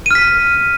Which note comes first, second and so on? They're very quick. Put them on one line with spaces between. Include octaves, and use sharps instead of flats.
D#7 F6 B6